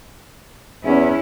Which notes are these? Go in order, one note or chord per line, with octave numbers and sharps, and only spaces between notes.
E2 C#4 E4